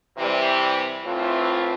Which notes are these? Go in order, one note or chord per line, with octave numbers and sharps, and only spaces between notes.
C3 E3 G3
A2 E3 A3 C4 F4